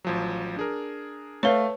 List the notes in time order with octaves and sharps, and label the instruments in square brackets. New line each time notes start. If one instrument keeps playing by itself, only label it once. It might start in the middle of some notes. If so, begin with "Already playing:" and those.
[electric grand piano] A1 F3 F#3
D4 G#4 A#4
[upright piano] A3 F5 [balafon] B4 C#5